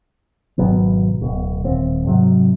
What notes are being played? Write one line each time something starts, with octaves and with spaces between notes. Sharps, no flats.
G#1 B2 F#3 B3
D1 B2
D#1 C4
G#2 C3 F#3